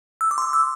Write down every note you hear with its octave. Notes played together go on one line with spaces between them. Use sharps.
E6
D6
C6
D6
E6